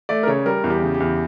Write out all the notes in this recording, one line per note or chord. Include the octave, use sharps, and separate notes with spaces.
A3 D5
A#4
C#3 C#5
G3 A#4
E2
G4
C#3
G4
E2